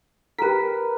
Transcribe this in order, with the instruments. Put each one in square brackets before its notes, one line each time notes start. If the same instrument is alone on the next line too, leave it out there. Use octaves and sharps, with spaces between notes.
[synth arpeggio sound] G4 B6 [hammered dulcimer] A#4 B4